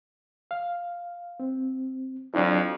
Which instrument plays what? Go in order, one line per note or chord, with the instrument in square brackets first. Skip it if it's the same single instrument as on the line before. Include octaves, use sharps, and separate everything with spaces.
[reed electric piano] F5
C4
[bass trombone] F2 [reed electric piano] F#3 D4 E4